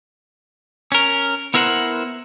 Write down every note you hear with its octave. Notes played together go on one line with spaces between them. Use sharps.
C#4 A#4
B3 E4 A#4 C5 F5 F#5